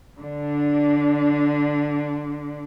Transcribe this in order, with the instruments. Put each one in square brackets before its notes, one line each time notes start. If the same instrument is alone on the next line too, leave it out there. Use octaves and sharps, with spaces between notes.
[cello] D3 D4